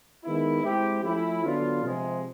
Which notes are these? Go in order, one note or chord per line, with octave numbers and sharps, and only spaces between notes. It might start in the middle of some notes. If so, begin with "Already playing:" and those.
D#3 G#3 B3 E4
G#3 C4 E4 G4
F3 A3 C#4 E4
D3 F#3 B3 D4 F4
C3 F3 G#3